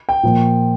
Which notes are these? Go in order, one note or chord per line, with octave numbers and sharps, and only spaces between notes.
G5
A#2 F3